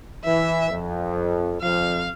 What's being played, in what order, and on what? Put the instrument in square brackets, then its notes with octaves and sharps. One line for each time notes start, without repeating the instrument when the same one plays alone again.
[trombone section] E3 [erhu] E5
[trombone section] F2
[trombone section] F2 [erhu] F5